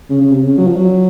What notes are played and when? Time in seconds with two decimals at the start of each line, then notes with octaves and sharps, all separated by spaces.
0.10 C#3
0.21 C#3
0.32 C3
0.42 C#3
0.58 F#3
0.67 F3
0.77 F#3